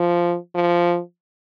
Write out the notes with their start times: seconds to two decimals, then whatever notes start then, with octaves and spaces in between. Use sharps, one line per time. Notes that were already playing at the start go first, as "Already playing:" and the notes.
Already playing: F3
0.55 F3